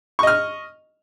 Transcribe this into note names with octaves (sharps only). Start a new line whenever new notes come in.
D#5 C#6 F6